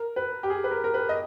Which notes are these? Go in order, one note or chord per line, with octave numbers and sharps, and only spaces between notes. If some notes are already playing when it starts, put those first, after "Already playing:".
Already playing: A#4
B4
G4
G#4
B4
A#4
A#4
B4
D#5